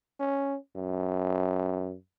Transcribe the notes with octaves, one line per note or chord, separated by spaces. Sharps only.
C#4
F#2